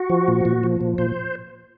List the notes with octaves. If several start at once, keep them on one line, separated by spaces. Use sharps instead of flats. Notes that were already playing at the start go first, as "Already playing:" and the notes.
Already playing: F#4
F3
A#2
A#2
F3
A#2
A#2 C5